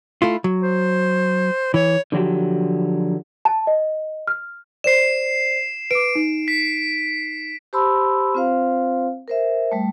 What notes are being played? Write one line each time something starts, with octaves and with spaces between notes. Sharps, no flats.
A3 E4 F4
F#3
C5
E3 C#5
D3 F3 F#3 G4
A5
D#5
F6
C5 D5 C7 E7
B4 D6 D7
D#4
B6
G4 C5 A5 B5 C6 E6
C4 F4 C5 F5
A#4 C5 E5
G3 A3